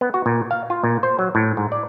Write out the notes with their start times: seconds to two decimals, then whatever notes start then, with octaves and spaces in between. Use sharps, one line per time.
0.01 B3
0.14 F#4
0.26 A#2
0.51 F5
0.70 F4
0.84 A#2
1.03 C5
1.19 F#3
1.35 A2
1.57 G#2
1.72 D5